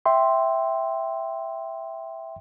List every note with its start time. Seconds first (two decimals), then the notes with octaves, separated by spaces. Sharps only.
0.06 E5 G5 C6